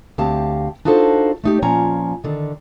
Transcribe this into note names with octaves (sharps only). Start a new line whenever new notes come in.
D2 C4 G4 F5 A5
D4 D#4 F4 F#4 A4 C5
A3 D#4 G4
A#2 F3 C#4 G#5 A#5
D3 D#3